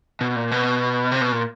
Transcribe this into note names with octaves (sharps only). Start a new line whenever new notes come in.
B2
A#2
B2
C3
B2
A#2